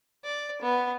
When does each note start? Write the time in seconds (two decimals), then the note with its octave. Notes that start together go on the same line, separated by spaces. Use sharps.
0.24 D5
0.62 B3